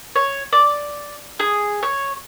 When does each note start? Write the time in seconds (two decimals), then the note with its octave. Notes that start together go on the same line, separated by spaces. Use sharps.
0.15 C#5
0.52 D5
1.40 G#4
1.83 C#5